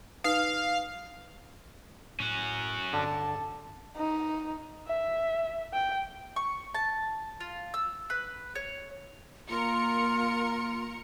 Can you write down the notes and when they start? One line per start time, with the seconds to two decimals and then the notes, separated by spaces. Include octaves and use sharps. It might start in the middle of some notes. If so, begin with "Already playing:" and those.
0.24 D#4 B4 F5 D#6
2.20 A2 C#4 F#4
2.93 G2 D3 A5
3.97 D#4
4.87 E5
5.74 G5
6.36 C#6
6.74 A5
7.40 F4
7.74 E6
8.10 B4
8.55 C#5
9.49 A#3 F4 A#4 C#7